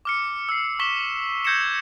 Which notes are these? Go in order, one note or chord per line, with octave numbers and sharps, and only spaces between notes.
D6 F6 C#7
E6 F6 C7
C#6 D6 B6 E7 G7
E6 G6 G#6 A#6 C#7 E7